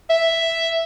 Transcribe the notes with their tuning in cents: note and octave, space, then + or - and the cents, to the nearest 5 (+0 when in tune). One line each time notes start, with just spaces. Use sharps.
E5 +0